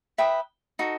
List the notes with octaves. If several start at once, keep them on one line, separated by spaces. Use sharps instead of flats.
B4 E5 G5 D#6
D#4 F#4 A4